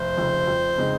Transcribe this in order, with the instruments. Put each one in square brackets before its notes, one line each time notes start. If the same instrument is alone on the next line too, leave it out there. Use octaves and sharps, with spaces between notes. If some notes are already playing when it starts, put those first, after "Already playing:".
Already playing: [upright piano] F1 [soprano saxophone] C5
[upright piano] F2 C#3
F2
C#3 G#3 C4 D#4